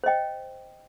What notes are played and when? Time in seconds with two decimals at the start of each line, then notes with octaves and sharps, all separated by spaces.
0.04 C5 D#5 G5